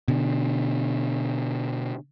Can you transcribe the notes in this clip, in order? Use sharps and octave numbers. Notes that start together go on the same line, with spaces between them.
B2 D3